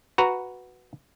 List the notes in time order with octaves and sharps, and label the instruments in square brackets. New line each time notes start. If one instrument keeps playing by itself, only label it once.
[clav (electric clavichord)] F#4 B4 A#5